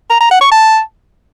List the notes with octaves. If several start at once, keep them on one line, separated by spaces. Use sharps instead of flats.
A#5
A#5
F#5
C#6
A5